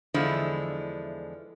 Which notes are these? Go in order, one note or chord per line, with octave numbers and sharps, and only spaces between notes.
E2 D3 F3 G#3 E4